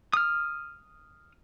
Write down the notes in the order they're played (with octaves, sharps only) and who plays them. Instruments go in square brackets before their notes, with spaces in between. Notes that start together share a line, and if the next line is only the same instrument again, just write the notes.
[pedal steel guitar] D#6 F6